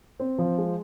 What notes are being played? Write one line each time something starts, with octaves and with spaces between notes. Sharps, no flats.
C4
F3
G#3